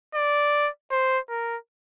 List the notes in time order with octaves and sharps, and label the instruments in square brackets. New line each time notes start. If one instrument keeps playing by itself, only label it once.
[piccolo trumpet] D5
C5
A#4